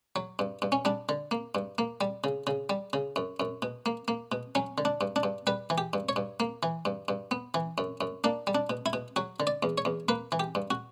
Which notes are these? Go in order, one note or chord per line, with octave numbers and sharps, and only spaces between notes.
F#3
G2
G2
C#4
G3 D4
D3
A#3
G2
A#3
G3
C#3
C#3
G3
C#3
F#2
F#2
B2
A#3
A#3
B2
F#3 C#4
D3
D4
G2
D4
G2
G3 B4
E3
G4
G2
C#5
G2
A#3
E3
G2
G2
B3
E3
F#2
F#2
A#3 D4
G3
D4
B2
E4
B2
F#3 F#4
D3
D5
E2
C#5
E2
A#3 B4
E3
G4
G2
F#4